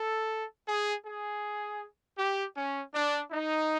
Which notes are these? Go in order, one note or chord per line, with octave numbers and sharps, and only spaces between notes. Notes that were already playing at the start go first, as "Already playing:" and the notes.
Already playing: A4
G#4
G#4
G4
C#4
D4
D#4